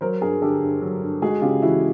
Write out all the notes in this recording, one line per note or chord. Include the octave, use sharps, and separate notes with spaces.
F#3 A#4 C5
G2 G#4 A#4
D3 G4 A4
G2
F#3
G2
G#3 F#4 G#4
C#3 F4 G4
E3 E4 F#4